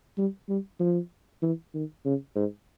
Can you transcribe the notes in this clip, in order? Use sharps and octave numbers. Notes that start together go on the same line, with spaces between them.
G3
G3
F3
E3
D#3
C#3
G#2